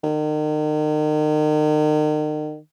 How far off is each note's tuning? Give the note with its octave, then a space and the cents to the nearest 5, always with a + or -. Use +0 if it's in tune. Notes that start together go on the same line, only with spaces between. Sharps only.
D#3 -35